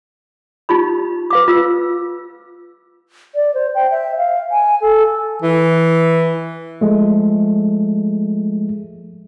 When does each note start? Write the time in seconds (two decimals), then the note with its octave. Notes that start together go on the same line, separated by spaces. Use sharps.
0.69 D#4 F4 G4 B5
1.30 B4 F5 D6
1.48 F4 E6
3.35 D5
3.54 C5
3.75 G5
3.91 E5
4.18 F5
4.51 G#5
4.82 A4
5.42 E3
6.81 F3 G#3 A3